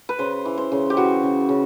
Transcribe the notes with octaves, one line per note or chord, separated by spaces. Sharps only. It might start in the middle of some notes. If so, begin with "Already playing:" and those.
B4
C#3 C5
E3
C5
C#3
G4
E3 F#4
C#3
C#3